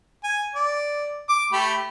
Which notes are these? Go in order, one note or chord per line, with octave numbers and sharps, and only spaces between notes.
G#5
D5
D6
A3 G4 B5